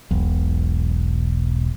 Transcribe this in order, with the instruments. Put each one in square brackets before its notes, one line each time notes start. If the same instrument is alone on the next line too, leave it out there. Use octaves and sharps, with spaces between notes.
[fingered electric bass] E1 B1